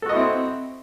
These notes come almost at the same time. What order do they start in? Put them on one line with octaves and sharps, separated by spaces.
A4 F#4 D#5 E4 C4